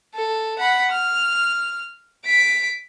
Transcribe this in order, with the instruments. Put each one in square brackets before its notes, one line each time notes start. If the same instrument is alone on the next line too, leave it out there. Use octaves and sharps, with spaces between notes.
[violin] A4
F#5 B5
F6
B6 D7